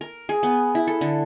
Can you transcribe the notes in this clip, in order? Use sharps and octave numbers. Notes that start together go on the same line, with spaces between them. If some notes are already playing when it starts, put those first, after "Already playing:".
A#4
G#4
B3
E4
A4
D3